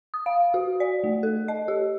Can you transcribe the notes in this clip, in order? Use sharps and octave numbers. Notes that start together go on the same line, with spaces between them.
D#6
F5
F#4
D5
A3
A4
D#5
G4